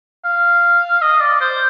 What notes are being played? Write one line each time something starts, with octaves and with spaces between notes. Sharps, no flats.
F5
D#5
D5
C5